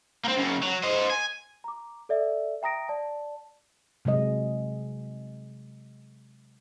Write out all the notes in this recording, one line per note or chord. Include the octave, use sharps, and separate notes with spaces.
A#3 C4
F#2 C#3
F#3
C5 D#5
G#5
A#5 D6
A4 D5 E5
E5 G5 A#5 D#6 A#6 D7
D5 A5
C3 F#3 G#3 D#5